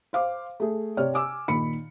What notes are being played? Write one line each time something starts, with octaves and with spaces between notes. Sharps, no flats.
C5 F5 D6
A3 G#4
C3 C4 C#5 D5 F6
G#5 D6 E6
A#2 D#3 B5 C#7